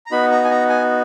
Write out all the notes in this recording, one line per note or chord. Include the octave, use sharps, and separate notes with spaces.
A#5
B3 D#4 F#4 B5
A#5
G#5
A#5
G#5